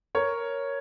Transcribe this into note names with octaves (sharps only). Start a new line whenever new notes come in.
A#4 C#5